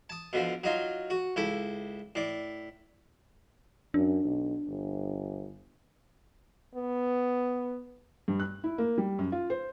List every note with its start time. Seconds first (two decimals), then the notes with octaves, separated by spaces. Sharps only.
0.10 A5 D#6
0.33 B2 D3 F3
0.64 F#3 D#4 F4
1.10 F#4
1.36 C#2 E4 A4
2.15 A2 D5
3.94 F#2 D4
4.25 B1
4.68 G1
6.75 B3
8.28 G2
8.40 F#6
8.64 E4
8.78 A#3
8.98 G3
9.19 F#2
9.32 F4
9.50 C5